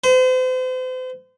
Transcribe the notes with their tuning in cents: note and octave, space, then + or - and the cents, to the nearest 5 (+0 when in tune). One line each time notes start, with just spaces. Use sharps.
C5 -40